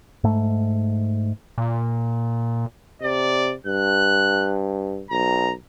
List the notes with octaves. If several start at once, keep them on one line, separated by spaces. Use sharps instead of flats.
G#2 A3
A#2
C3 D5
G2 F#6
B1 A#5